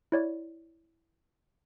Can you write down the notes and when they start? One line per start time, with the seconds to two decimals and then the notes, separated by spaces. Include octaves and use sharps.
0.12 E4 C#5 D5